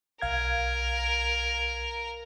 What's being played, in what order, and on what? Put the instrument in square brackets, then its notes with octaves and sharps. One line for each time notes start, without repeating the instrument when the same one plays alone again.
[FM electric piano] B1 F5 G#6 [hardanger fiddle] A#4